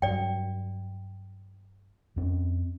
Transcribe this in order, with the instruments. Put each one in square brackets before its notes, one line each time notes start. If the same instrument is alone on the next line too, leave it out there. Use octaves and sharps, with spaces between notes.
[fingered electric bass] G2 F#3 [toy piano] D5 G5
[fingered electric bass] F2 C4 C#4